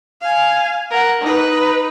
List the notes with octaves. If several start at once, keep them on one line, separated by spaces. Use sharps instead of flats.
F5 G#5
A#4 F#5
D#4 B4